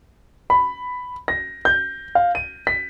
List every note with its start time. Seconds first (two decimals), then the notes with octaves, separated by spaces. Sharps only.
0.50 B5
1.28 A#6
1.65 G6
2.15 F5
2.35 D#7
2.67 B6